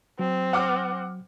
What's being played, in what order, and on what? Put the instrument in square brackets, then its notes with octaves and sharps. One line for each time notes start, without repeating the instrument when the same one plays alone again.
[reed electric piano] F#3 [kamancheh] C4
[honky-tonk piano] F#5 D6 F6